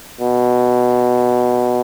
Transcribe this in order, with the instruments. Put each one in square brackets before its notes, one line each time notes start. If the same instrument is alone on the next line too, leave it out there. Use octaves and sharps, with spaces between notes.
[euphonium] B2